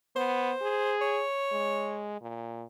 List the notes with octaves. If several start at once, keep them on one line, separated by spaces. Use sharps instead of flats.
B3 C5
G#4
C#5
G#3
A#2